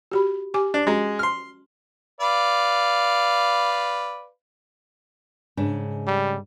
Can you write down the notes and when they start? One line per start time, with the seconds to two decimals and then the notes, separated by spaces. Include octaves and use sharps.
0.11 F#4 G4 B5
0.54 G4 G#5 D6
0.74 D4
0.87 G#3 C#4 F#4 A#5
1.19 C6 F6
2.20 B4 D5 F5
5.57 G#2 C#3 D4
6.07 G3